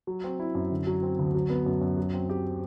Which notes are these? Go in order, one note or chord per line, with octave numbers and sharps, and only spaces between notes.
F#3
C4
E4
F#2
D3
F#3
C4
D2
F#3
B3
F#2
F#2
F#3
C4
G4